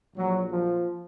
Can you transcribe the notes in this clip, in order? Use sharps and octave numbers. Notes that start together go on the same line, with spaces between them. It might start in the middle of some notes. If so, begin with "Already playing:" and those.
A#1 A#2 F3 F#3
F3